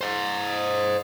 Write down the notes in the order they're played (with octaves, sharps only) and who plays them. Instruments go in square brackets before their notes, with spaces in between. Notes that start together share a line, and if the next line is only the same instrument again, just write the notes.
[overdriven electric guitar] C5 D#5